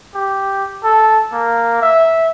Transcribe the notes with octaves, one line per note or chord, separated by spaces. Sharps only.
G4
A4
A#3
E5